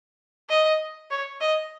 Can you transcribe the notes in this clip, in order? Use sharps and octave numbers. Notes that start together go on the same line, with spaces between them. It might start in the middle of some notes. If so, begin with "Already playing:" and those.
D#5
C#5
D#5